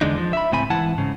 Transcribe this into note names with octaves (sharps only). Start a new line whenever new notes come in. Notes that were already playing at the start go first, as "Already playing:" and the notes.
E2 D3 G#3 D4 D#4
F3
E5 B5
C#2 A2 C4 G#5 B5
G#2 E3 E4 F#5 A5
G#2 C#3